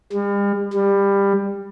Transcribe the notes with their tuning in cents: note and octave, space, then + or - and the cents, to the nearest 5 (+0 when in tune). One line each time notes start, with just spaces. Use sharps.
G3 +45
G3 +20